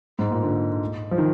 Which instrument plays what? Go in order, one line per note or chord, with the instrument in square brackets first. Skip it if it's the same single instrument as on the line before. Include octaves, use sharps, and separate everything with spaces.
[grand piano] G#2
A#2
D3
F3
D#3